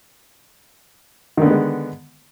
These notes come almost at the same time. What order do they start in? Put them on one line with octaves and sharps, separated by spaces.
D#3 D3 B3 G#3